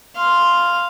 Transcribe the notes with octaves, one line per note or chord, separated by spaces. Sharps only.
F5 C6